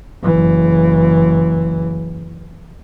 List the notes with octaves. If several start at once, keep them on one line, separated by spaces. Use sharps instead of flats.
F#1 E3